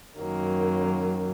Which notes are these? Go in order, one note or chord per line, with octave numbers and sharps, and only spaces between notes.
F#2 D#3 F#3 A#3